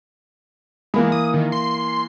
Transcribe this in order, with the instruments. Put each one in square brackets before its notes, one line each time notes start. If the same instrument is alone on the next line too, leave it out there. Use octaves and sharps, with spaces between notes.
[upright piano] E3 A#3 B5 [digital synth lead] G#3
[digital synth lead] D#6
D#3
C6